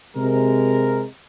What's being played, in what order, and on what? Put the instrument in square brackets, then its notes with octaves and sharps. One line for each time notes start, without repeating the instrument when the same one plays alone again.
[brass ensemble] C3 G#3 A#4